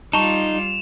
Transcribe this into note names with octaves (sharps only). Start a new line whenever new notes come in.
G3 D#4 F4 A5 C#6 E7 F7